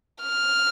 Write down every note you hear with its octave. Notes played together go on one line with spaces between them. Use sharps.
F6